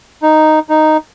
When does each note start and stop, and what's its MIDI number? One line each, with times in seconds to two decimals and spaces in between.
0.22 0.59 63
0.69 0.97 63